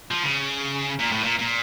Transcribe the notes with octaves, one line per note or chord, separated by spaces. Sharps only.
F3
C#3
A#2
A2
A#2
A#2